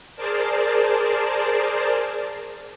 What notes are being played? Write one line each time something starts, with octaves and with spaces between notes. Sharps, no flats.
G#4 A#4 C5 D5 A5